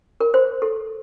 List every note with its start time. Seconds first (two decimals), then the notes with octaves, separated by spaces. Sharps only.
0.21 A#4
0.34 C5
0.62 A4